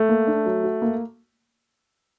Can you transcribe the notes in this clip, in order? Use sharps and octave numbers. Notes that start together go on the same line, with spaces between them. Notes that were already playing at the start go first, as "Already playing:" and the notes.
Already playing: A3
A#3
D4
F#3
F#4
A#3